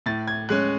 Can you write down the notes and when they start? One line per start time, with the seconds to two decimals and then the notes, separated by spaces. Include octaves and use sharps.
0.06 A2 A6
0.27 G#6
0.49 G#3 C#4 F#6